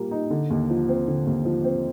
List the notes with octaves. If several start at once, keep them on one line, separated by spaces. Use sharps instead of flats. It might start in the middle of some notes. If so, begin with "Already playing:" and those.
Already playing: A#2 G3 A#3
D#4
D3
D#2
F3
C4
D3
D#2
F3
C4